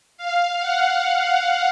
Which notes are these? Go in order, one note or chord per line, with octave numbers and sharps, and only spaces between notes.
F5
F#5